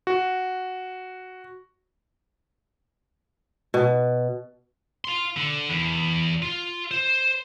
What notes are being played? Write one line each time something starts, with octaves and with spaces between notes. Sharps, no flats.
F#4
B2
F5 C6
D3
E2
F4
C5